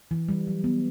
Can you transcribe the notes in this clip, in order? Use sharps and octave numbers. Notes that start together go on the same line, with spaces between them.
E3
G3
F#3
B3